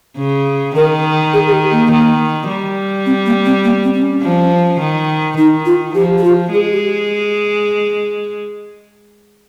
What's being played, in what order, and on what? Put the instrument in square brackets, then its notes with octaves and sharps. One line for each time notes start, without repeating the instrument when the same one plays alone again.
[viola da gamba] C#3
[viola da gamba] D#3 [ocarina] A#4
[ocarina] G#4
G#4
G4
A#3
[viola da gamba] D#3
G3
[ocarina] C4
A#3
C4
A#3
C4
C4
C#4
[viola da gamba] F3
D#3
[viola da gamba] D#3 [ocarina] D#4
[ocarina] F4
[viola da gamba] F3 [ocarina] G4
[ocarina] G4
F4
[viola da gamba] G#3 [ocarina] G#4
[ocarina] G4